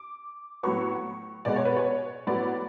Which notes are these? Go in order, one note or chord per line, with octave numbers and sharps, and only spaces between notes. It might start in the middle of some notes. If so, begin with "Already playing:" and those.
Already playing: D6
A2 F#3 B3 C#6
B2 G#3 B3 D5
C#5
B4
C#5
A2 F#3 B3 D5